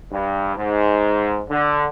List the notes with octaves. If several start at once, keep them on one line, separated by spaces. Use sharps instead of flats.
G2
G#2
D3